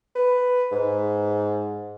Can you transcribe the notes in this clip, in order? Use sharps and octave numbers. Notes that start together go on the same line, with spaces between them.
B4
G#2